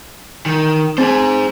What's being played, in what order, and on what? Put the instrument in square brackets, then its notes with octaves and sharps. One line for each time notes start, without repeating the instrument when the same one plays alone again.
[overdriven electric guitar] D#3
[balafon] C4 [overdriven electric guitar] G#4 C5